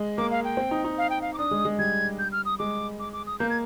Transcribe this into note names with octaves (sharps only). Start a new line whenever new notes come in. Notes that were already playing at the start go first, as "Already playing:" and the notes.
Already playing: G#3
A#3 D6
F5
G5
C4
D#4
D#4
F5
G5
F5
D6
D4 D#6
G#3
G#3
G3 G#6
G6
F6
D#6
G#3 D6
D6
D6
D#6
A#3 G6
G#6